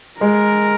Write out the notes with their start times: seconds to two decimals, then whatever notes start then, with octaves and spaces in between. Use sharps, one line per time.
0.21 G#3 A#4